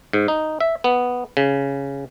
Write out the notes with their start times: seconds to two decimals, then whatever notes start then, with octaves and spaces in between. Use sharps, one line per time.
0.13 G#2
0.28 D#4
0.60 E5
0.84 B3
1.37 C#3